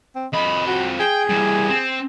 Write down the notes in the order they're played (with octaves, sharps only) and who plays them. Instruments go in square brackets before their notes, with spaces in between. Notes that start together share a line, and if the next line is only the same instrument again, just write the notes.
[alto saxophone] C4
[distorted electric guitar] F2 B5 [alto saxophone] D#5
[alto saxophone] F#4
[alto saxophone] G#4 [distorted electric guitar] G5
[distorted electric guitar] E3 G3
C4